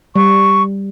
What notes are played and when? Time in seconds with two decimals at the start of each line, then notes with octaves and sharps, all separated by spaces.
0.16 G3 C#6